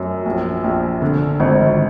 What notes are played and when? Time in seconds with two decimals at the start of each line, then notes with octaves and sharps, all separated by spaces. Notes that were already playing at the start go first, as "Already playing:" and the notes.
Already playing: F#2 C#4
0.25 A#1
0.64 A#1
1.02 D3
1.40 G#1